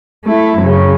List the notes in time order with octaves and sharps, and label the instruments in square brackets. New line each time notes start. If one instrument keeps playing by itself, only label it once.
[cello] A3 E4
F#2 C#3